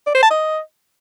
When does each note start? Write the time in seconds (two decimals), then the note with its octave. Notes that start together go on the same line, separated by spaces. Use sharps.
0.07 D5
0.15 C5
0.23 A5
0.31 D#5